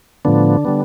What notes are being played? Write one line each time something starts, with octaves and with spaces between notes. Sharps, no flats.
A2 D3 F3 B3 D4
D3 G3 B3